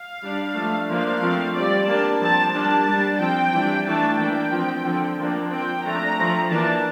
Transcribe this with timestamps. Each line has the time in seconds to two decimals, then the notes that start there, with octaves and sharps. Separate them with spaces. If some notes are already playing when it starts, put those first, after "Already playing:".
Already playing: F5
0.23 G3 D4
0.55 F3 A3 D4
0.88 F3 A#3 D4 F5
1.22 F3 A3 C4
1.55 G3 C4 D5
1.87 G3 A#3 D4 A5
2.20 F3 C4 A5
2.53 G3 A#3 D4 A5
2.87 G3 D4
3.19 F3 C4 G5
3.52 E3 G3 D4
3.86 E3 A3 D4 A5
4.18 E3 A#3 D4 G5
4.51 F3 C4
4.85 D3 F3 C4
5.18 F3 A#3 D4
5.51 F3 C4 G5
5.84 F3 A3 D4 A#5
6.18 F3 A3 C4
6.50 E3 A#3 D4 A5